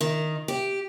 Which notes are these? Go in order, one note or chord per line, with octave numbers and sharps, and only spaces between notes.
D#3
G4